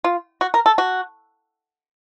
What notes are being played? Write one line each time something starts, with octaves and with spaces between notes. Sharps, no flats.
F4
F#4
A#4
A4
F#4